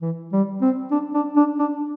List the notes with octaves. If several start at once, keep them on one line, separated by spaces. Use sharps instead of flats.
E3
G3
C4
D4
D4
D4
D4